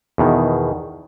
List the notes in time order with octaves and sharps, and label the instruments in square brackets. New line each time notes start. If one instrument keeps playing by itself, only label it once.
[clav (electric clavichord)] E2 B2 D#3